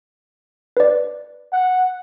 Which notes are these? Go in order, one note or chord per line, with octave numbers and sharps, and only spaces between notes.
B4 D5
F#5